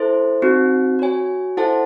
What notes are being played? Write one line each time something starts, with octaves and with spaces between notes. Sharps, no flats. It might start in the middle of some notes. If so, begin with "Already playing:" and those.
Already playing: E4 A4 C5
C4 D#4 F#4
F#4 C#5 G#5
E4 A4 C5 F#5 A5